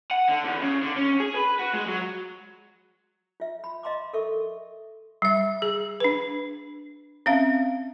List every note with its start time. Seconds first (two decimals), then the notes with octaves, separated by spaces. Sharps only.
0.11 F#5
0.29 D3
0.44 E2
0.61 C#3
0.82 D3
0.96 C#4
1.20 G#4
1.36 B4
1.59 F#4
1.74 G#3
1.88 F#3
3.40 F4 E5
3.64 B5
3.83 D#5 F5 A#5 C6 D6
4.13 A4 A#4 E5 C#6
5.22 G3 E5
5.62 G#4
6.00 D4 B4
7.26 C4 C#4 E5 F5